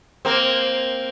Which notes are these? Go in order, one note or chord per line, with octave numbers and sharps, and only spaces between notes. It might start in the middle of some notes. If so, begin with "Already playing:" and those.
A#3 C4